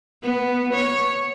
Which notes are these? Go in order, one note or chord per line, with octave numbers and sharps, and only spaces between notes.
B3
C#5